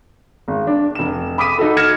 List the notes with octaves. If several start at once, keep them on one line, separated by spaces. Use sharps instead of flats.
G#1
D4
F1 E7
B5 D6 D#6 B6 D#7
D#4 F#4 A4
F6 G#6 A#6 C#7 E7